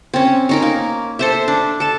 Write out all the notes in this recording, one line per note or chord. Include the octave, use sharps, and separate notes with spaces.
C4 C#4
C#4 D#4 A#4
A#3
A4 C5 E5
D4
A4 A5